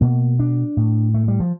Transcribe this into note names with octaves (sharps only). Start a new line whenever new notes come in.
B2 A#3
D4
A2
A3
G3
F3